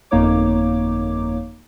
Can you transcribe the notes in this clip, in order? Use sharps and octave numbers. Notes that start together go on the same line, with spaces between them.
G1 F2 A#3 D#4 C#5 D6